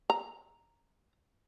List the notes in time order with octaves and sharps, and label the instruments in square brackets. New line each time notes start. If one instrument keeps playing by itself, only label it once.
[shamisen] A#5